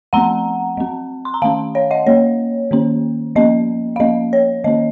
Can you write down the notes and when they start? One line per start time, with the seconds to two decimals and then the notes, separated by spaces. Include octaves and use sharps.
0.13 F3 A3 C4 F#5 A#5
0.77 F#3 C4
1.25 C6
1.34 A#5
1.42 D#3 A3 C#4 F5 A5
1.75 C#5 F5
1.91 D#5 F#5
2.07 F#3 A#3 C#4 C#5
2.71 D#3 A#3 C#4
3.35 F3 A#3 C#4 D#5
3.96 F5
4.00 F3 A#3 C#4 D#5
4.33 C#5
4.64 D#3 A#3 C#4 D#5